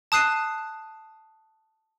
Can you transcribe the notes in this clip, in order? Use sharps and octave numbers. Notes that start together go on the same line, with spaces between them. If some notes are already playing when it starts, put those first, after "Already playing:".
A5 D#6 F#6 C7 D#7